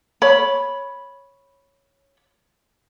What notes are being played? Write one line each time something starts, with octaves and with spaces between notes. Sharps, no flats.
C#5 B5